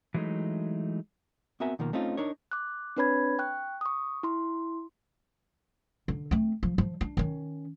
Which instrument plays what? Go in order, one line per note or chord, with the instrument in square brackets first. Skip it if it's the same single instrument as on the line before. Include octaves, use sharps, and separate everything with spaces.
[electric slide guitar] E3 F#3 G#3 A3 D#4
[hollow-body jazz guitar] B3 C4 F#4 A#4 E5 G#5
B2 D#3 F3 A#3
A3 C4 C#4 D#4 F4
D4 D#4 A#4 C#5
[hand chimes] D6 F#6
C4 D4 B4 C#5 B5 G#6
G5 C#6 F#6
C#6 D#6
E4 C6
[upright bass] D3
A3 C4
F3
F3
D4
D#3 C#4